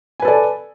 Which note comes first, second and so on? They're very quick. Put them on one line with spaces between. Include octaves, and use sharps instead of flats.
G#5 B4 A4 D5